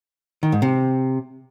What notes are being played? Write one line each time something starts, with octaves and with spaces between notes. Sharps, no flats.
D#3
G#2
C3